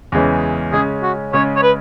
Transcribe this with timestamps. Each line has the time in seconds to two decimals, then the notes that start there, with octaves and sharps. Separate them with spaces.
0.12 E2 C#3 E3 G#3 C#4
0.72 C#3 G#3 C#4 G#4
1.03 F#4
1.33 C#3 G#3 C#4 C#5
1.56 C#5
1.63 B4